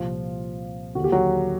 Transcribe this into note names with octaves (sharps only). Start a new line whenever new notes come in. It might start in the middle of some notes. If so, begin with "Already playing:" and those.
Already playing: C2 A#2 F3 F4
D#2 D3 F#4
G4
F#3 F#4